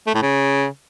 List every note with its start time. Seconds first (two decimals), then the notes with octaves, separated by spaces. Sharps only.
0.07 A3
0.15 A2
0.22 C#3